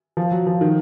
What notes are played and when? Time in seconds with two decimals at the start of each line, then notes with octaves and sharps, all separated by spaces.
0.17 F3
0.31 F#3
0.47 F3
0.61 D#3